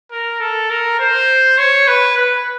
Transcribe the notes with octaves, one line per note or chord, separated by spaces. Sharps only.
A#4
A4
A#4
C5
C#5
B4
B4